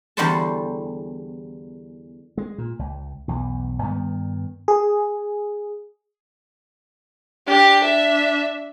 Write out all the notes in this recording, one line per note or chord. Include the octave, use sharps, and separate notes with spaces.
E2 D3 G3 C5 C#5 A5
G#3
A#2
C#2
B1 E2
G2 D#3 B3
G#4
D4 G4
E5